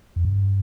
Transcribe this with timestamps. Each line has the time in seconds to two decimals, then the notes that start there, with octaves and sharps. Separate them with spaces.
0.16 F2
0.25 G2